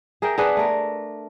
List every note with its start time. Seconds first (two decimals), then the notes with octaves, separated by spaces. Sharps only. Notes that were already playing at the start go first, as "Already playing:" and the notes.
0.22 G#4 A#4 E5 G5
0.38 B3 D4 G#4 B4
0.57 A3 A#4